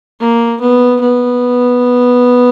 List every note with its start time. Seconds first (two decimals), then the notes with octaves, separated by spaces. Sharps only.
0.21 A#3
0.61 B3
1.01 B3